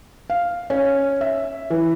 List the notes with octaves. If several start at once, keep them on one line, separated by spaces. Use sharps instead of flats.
F5
C#4
E5
E3